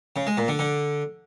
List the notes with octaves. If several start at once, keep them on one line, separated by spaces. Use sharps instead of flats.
C#3
G#3
A#2
D3
D3